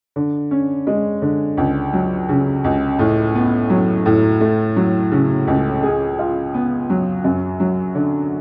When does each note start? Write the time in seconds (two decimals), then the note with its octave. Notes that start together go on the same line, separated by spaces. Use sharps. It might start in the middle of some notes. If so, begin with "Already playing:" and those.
0.16 D3
0.51 C#4
0.87 G#3
1.22 D3
1.57 C#2
1.93 F#3
2.29 C#3
2.64 C#2
2.99 A2
3.35 B3
3.70 F#3
4.06 A2
4.41 A3
4.76 F#3
5.12 C#3
5.47 C#2
5.83 G#4
6.19 F4
6.54 B3
6.90 F#3
7.24 F#2
7.60 F#3
7.95 D3